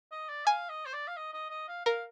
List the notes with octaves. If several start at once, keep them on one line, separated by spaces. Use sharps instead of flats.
D#5
D5
F5 G#5
D#5
C5
D5
F5
D#5
D#5
D#5
F5
A#4 F5